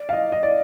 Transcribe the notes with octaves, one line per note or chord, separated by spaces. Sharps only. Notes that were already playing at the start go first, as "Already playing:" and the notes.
Already playing: D5
F5
D#5
D#5
D5